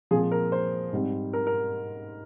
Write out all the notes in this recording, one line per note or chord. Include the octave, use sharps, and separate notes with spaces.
A#2 F3 G#3 C4 G#4
A#4
C5
G#2 G3 C4
A#4
A#4